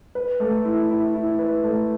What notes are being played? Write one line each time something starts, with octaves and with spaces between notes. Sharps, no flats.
B4
A3
E4
E4
E4
B4
A3